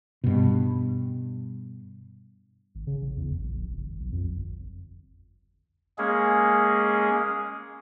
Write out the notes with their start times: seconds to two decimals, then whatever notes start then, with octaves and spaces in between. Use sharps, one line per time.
0.24 G2 B2
2.75 G#1
2.87 C#3
3.01 A1
3.16 E2
3.29 G1
3.43 A#1
3.56 D1
3.70 F#1
3.84 G#1
4.00 B1
4.12 F2
4.26 G1
5.98 G#3 A#3 C#4 G#4